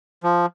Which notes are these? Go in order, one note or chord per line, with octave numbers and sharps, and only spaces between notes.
F3